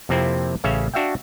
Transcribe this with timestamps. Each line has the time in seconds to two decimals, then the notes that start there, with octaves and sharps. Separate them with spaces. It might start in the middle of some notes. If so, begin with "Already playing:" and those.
0.09 F2 C3 A#3 C4 E4
0.64 A1 C#3 C#4 E5 F5
0.94 D4 F#4 E5 F5 G5